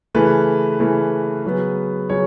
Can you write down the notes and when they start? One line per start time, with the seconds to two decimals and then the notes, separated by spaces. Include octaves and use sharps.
0.14 C#3 E3 A3 B4
0.80 C#3 E3 A3
1.45 C#3 F#3 B3
2.10 C#3 F#3 C#5